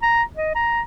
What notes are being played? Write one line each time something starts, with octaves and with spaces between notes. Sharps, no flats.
A#5
D#5
A#5